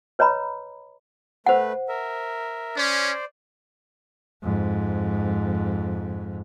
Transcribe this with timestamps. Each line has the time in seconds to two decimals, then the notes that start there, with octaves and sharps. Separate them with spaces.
0.19 B4 C#5 D#5 A#5 B5
1.46 A3 B4 C5 F#5
1.89 A#4 E5
2.77 C#4 C5 D5
4.43 F2 G#2